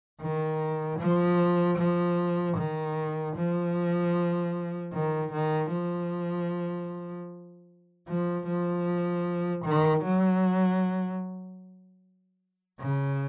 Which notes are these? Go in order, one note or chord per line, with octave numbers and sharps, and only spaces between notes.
D#3
F3
F3
D#3
F3
D#3
D#3
F3
F3
F3
D#3
F#3
C#3